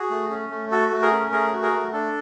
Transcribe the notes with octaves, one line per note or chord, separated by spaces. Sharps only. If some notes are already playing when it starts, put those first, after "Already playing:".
Already playing: F#4 G#4
A3
C#4
A3
F#4 A4
A3
G#4 A#4
C#4
A3 G#4 A#4
F#4
G#4 A#4
A3
D4 A4